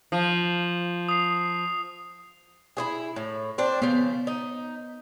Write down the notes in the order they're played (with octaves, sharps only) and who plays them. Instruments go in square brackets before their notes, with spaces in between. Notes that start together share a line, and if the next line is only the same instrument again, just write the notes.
[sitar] F3
[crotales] D#6 C7
[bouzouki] E4 F#4 G#4
A2
C4 D4
[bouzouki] C#3 F3 [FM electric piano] B3
[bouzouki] D#4